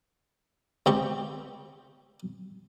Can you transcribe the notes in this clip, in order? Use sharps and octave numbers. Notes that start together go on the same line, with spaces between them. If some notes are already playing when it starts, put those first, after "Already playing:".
C#2 C4 G4 C#6